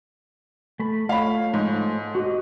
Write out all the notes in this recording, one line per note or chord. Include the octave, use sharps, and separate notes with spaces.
A3 B5
A3 F4 C#5 F5 B5
G#2
F#4 G4 D#5